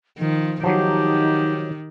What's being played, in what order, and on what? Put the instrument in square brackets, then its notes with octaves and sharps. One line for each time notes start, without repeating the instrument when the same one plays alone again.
[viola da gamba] D#3 [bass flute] F3
[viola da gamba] D#3 [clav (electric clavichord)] F3 F#3 [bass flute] D#4 [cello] G4